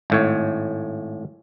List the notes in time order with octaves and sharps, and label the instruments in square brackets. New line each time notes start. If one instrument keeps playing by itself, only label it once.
[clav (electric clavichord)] G#1 A2 C#5